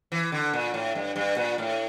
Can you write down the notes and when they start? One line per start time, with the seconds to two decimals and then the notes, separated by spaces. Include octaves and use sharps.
0.12 E3
0.32 D3
0.53 A#2
0.74 A2
0.95 G2
1.16 G2
1.37 A#2
1.58 A2